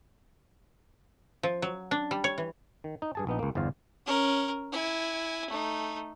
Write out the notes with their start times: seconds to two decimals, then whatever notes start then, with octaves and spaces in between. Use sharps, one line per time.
1.43 F3
1.62 F#3
1.91 D4
2.11 G3
2.24 C#5
2.38 E3
2.84 D#3
3.02 D#4
3.15 G2 G#4 A5
3.27 A#1 B3 D#4
3.39 C#2 A#3
3.55 G1 E2 C5 D5 F5
4.06 C#4 A#4
4.72 E4 G#5
5.50 A3 D#4